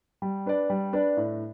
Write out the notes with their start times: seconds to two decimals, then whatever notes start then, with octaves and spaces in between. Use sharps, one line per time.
0.22 G3
0.46 D4 B4 D5
0.70 G3
0.93 D4 B4 D5
1.17 A2